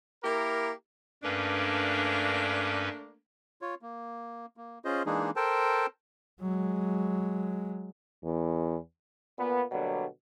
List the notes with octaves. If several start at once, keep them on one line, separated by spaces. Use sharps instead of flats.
A#3 E4 G4 A#4
G2 A3 A#3 C#4 D4 B4
F4 C#5
A#3
A#3
C#4 F4 G#4 C5 D#5
E3 G#3 A#3 D4 D#4 G#4
A4 A#4 C5 G5 A5
F#3 G#3
E2
A#2 B3
B2 D3 F#3 G3 A#3